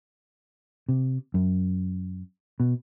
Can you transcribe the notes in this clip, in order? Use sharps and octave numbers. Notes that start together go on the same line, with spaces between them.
C3
F#2
B2